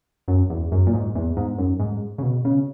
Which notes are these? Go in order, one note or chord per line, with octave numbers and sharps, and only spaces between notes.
F#2
E2
F#2
A#2
G#2
E2
G#2
F#2
G#2
C#3
B2
C#3